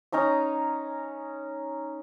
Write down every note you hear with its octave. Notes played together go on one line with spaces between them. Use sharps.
C#4 D#4 A#5 D#6